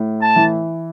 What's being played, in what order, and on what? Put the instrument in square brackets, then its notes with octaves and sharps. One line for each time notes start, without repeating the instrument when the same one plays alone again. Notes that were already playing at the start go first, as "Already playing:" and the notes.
Already playing: [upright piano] A2
[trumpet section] A5
[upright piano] E3